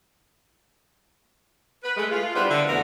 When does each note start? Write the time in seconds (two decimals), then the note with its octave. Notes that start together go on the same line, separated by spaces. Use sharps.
1.83 B4
1.97 G#3 A3
2.11 F4
2.35 G3 B3 D4 E4 B4 C5
2.50 D3
2.68 F2 B2 E3 A3 B3 A#4